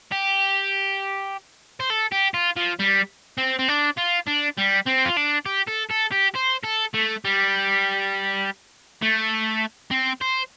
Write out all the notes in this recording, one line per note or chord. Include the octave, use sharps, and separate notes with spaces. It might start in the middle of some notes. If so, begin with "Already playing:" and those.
G4
C5
A4
G4
F4
F3
G3
C4
C4
D4
F4
D4
G3
C4
F4
D4
G4
A4
A4
G4
C5
A4
A3
G3
A3
C4
C5